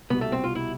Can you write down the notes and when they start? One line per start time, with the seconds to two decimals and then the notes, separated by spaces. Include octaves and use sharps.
0.10 C2 B2 G3 B3
0.21 A3
0.32 C4
0.44 F4
0.55 E4